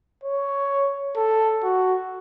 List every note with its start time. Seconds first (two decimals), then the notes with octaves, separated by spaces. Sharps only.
0.24 C#5
1.16 A4
1.63 F#4